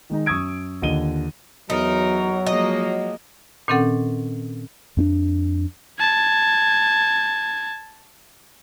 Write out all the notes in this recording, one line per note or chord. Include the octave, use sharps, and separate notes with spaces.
D#3 G#3 D#4
F#2 C#6 D#6 E6 G#6 D7
D#2 D3 F4 D#5 D#7 G7
E2 F#3 D#4 A#4
F3 G#3 A#3 D#5
A#2 D#3 C4 C#4 A4 F#5
F2 B3 D4
A5 G#6